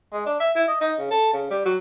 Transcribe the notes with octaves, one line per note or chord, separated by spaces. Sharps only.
G#3
D4
E5
E4
D#5
D#4
C#3
A4
C#3
G3
F#3